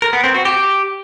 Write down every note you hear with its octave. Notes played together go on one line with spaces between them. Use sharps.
A#4
B3
C4
F#4
G4